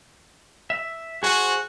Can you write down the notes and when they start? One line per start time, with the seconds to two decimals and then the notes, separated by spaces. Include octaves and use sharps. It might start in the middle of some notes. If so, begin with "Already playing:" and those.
0.70 E5
1.23 F#4 G#4 C5 G#5